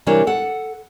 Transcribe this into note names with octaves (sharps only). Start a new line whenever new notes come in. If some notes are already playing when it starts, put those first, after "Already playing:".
C3 E3 G3 D4 A#4 C#5
A4 F#5